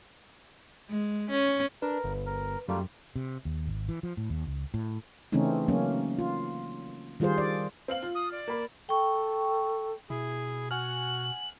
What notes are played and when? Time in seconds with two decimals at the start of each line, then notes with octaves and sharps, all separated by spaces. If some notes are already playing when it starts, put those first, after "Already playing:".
0.89 G#3
1.31 C#4
1.82 D4 A#4 B4
2.04 G1
2.26 A#4
2.68 F#2 G3 A3 A#3 F4
3.16 C3
3.45 D#2
3.67 G#1
3.89 E3
4.03 F3
4.17 A2
4.30 D#2
4.47 C#2
4.74 A2
5.32 C#3 E3 A3 C4 C#4 D#4
5.68 F#3 A#3 C#4
6.19 F4
7.20 D#3 G3 F4 G#4 C5
7.38 D5
7.88 C4 F5 F#7
8.03 F4
8.15 D#6
8.32 D5
8.48 A#3 B5
8.89 A4 G5 C#6
10.10 B2 E4 G#4
10.71 F#4 F#5 G#5 F6 F#7